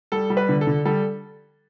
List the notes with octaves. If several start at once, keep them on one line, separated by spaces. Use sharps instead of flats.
G3 A4
G3
B4
D3
A4
D3
G3 A4